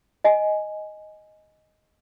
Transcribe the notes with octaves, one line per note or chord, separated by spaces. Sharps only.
D#5 G#5